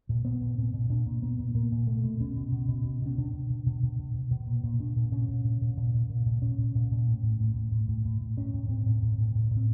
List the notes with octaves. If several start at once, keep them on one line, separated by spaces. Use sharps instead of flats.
A#2
A#2 B3
A#2
A#2 C4
A#2
A#2 D4
A#2
A#2 B3
A#2
A#2 A#3
A#2
B2 A3
B2
B2 C#4
B2
B2
B2
B2
B2 C#4
B2 D4
B2
B2
B2
B2
B2
B2
B2
A#2
A#2
A#2 D4
A#2
A#2 C#4
A#2
A#2
A#2
A#2
A#2
A#2
A#2
A#2 C#4
A#2
A#2
A#2
A2
A2
A2
A2
A2
A2
A2
A2
A2 C#4
A2
A2 C4
A2
A2
A2
A2
A2
C4